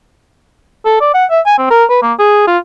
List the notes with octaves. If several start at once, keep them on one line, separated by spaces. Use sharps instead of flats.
A4
D5
F#5
E5
G#5
C4
A#4
B4
A#3
G#4
F4